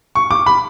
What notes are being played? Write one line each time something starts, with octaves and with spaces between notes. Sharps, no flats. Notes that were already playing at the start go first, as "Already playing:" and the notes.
C#6
D6
B5